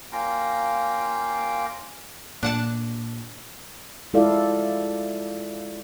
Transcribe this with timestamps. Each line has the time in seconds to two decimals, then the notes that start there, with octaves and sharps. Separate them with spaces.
0.12 A#3 C#4 F4 F5 G5 A#5
2.43 A#2 D4 F#5 A5
4.14 G#3 E4 F4 A4 D5 F5